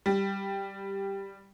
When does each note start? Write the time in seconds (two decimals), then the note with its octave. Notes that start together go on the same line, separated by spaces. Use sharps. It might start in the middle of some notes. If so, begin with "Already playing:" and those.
0.06 G3